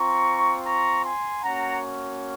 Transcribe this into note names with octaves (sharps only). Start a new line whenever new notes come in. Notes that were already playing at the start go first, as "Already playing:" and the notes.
Already playing: C4 F4 A#5 C#6
A#5 C#6
G#5 C6
A#3 C#4 F#4 F#5 A#5